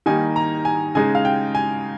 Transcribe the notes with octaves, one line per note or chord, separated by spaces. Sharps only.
D#3 G3 A#3 D#4 G#5
A#5
G#5
C#3 G#3 D#4 G#5
F5
G5
G#5